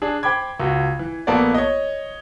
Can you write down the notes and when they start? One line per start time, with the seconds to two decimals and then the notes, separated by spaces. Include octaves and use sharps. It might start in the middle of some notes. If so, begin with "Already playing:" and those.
0.02 D4 G#4
0.23 C5 G5 B5 D6 G#6
0.60 C#2 F#4
0.99 E3
1.27 A#1 A#3 B3 A4 D5
1.54 C#5 D#5